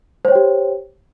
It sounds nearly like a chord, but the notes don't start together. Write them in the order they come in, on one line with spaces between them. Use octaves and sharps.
C5 C#5 G5 G4